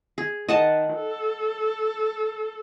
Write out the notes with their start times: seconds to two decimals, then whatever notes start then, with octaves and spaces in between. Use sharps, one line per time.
0.18 G#4
0.48 D#3 D#5 F#5 A5
0.95 A4